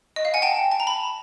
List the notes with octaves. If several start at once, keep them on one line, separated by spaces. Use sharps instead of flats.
D#5
F5
F#5 G#5
G5 A5
A5
A#5
A5 B5